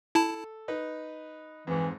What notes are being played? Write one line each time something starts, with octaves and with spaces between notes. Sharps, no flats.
E4 A4 A5
D#4 B4
F2 G#2 E3